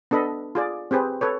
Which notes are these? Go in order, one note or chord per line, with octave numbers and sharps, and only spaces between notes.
B3 D4 A4 D#5 B5
F4 G#4 D5
C4 G4 G#4 B4 C5
A4 B4 C#5